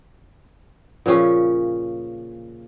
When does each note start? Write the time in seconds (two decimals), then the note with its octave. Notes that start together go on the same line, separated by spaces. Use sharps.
1.06 A#2 C#3 F3 C#4